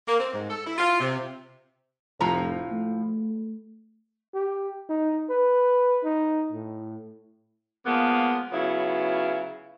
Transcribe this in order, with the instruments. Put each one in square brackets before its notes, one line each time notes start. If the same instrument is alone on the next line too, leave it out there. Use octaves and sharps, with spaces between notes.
[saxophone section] A#3
C4
G#2
A4
E4
F4
C3
[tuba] F1 [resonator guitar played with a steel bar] A2 F3 A#5
[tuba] A3
[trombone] G4
D#4
B4
D#4
A2
[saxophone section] F3 G#3 A#3 B3
C#3 F#3 B3 E4 F4